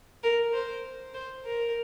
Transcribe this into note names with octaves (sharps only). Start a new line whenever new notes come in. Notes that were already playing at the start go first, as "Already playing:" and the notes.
A#4
C5
C5
A#4